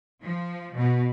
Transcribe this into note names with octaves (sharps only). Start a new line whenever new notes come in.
F3
B2